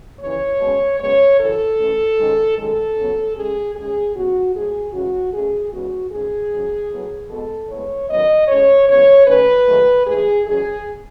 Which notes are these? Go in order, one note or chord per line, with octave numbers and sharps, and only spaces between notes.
D#2 C#3 E3 C#5
B2 G#3 C#4
F#2 C#3 G#3 B3 C#5
F#2 C#3 E3 A4
A2 E3 A3 C#4
G#2 D#3 G#3 C#4
F#2 D#3 G#3 A4
C#3 F#3 B3
C#3 G#3 C#4 G#4
D#2 C#3 G#3 C#4 G#4
C#3 F#3 B3 F#4
G#2 F#3 A3 G#4
C#3 E3 G#3 C#4 F#4
B2 A3 C#4 G#4
E2 C#3 G#3 B3 F#4
G#2 D#3 A3 C#4 G#4
G#2 F#3 C#4
A2 F#3 B3
B2 G#3 B3 A4
A2 G#3 B3 C#5
F#2 D#3 F#3 B3 D#5
A2 G#3 C#4 C#5
C#3 E3 G#3 B3 C#5
D#2 D#3 A3 C#4 B4
G#2 D#3 F#3 A3
G#2 E3 A3 G#4
E2 B2 F#3 C#4 G#4